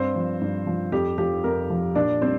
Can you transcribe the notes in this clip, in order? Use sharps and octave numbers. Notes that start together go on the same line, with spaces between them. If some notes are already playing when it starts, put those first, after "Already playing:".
Already playing: G2 C4 C5
F3
G2
F3
F2 G4
F3 G4
F2 A#4
F3
A#2 D4 D5
G3 C4 C5